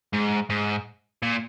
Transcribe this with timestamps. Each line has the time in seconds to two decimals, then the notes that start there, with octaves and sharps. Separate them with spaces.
0.13 G#2
0.50 G#2
1.22 A#2